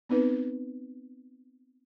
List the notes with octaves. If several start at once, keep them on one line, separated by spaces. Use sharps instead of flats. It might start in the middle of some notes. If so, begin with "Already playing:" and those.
B3 C4 D#4 B4